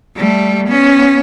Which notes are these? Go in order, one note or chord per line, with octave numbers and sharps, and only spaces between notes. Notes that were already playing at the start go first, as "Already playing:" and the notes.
G3 A3
B3 C#4